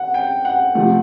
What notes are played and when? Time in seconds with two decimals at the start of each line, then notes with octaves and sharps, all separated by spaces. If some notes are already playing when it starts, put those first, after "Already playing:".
Already playing: F#5
0.14 G5
0.45 F#5
0.75 C3 F3 A3 F#5